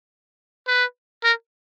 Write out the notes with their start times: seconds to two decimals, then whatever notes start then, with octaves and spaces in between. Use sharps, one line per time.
0.67 B4
1.24 A#4